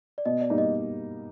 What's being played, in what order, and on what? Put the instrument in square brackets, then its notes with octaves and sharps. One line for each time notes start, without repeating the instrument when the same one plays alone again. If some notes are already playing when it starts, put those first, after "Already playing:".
[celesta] D5
[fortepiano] B2 [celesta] D#5
[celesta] D5
[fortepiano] G3 A#3 D#4
[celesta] D#5